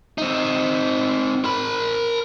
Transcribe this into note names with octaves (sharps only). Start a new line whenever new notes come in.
C4 D#4
A#4 B5